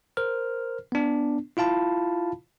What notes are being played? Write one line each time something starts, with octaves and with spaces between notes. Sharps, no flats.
A#4 C5 F6
B3 D4
E4 F4 F5 A5 B5